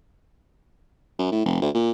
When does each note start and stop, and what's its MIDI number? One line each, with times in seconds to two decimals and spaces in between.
1.19 1.30 42
1.32 1.41 45
1.45 1.61 29
1.62 1.70 38
1.74 1.91 46